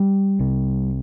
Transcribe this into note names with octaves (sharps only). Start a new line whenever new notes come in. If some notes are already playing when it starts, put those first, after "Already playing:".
Already playing: G3
C2 C3